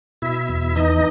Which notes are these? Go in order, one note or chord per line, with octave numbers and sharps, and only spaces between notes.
B2 E4 E5
E2
E3 D#4 D#5